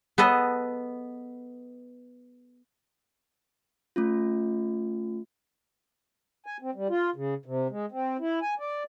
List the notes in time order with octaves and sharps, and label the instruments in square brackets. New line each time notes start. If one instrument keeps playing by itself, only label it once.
[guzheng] B3 A4 B4 D#5
[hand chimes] A3 C#4 F4
[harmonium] G#5
C4
G3
F4
C#3
C3
G#3
C4
E4
G#5
D5